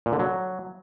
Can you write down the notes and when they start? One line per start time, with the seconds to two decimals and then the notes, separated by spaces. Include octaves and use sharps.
0.06 A#2
0.13 D3
0.19 F#3